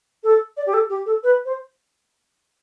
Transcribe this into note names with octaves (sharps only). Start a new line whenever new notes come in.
A4
D5
G4
A4
G4
A4
B4
C5